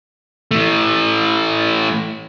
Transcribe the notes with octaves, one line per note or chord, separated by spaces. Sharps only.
E3 A3